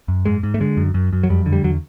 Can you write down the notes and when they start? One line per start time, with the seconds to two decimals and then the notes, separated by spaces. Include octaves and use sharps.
0.08 F#2
0.25 G#2 G#3
0.43 G#2
0.54 A3
0.61 D3 G#3
0.77 F#2
0.94 F#2
1.13 F#2
1.23 F#3
1.30 F2 G3
1.46 D3
1.52 G3
1.64 E2 F#3